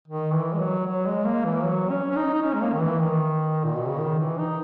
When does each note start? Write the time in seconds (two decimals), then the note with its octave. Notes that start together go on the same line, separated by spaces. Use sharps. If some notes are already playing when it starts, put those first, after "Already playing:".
0.08 D#3
0.33 E3
0.54 G#3
0.59 F#3
0.86 F#3
1.06 G#3
1.25 A#3
1.45 E3
1.64 F#3
1.90 C#4
2.11 C#4
2.16 D#4
2.33 D#4
2.42 C#4
2.54 G#3
2.62 A#3
2.73 D#3
2.81 E3
3.01 D#3
3.64 A#2
3.76 B2
3.88 C#3
3.99 D#3
4.19 E3
4.39 D#4